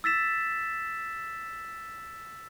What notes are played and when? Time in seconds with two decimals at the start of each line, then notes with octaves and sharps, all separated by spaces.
0.04 E6 A6 B6 E7